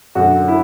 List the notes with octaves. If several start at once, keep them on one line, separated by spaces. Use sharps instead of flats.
F#2 D3 F#4
E4